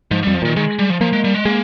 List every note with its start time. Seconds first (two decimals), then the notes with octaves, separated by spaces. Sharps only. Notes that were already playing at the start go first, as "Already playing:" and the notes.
0.11 G#2 F3
0.23 F2 G3
0.34 F3
0.42 A#2 D#3
0.56 D#3 G#3
0.79 G3
0.90 F3
1.01 F3 A#3
1.13 G#3
1.24 G3
1.35 G#3
1.45 G#3 A#3